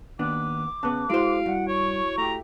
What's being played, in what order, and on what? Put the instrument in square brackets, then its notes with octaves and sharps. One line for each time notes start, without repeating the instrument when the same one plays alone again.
[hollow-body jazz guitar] D#2 B3 D4 [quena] D6
[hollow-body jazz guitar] C#3 B3 [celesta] A5 F#6
[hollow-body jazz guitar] G#3 C5 [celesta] E4 F#4 D7 [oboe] F5
[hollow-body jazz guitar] G2 [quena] F#5
[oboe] C#5 [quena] C#6
[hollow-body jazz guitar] A3 G4 [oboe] A#5